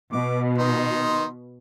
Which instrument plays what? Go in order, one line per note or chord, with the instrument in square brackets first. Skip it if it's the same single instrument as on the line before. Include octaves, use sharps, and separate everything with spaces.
[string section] B2 [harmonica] D6
[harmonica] D#3 D#4 C6